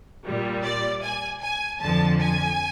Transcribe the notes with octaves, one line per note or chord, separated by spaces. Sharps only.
A#2 G3
D5
G#5
G#5
F2 D3 F3 A5
G#5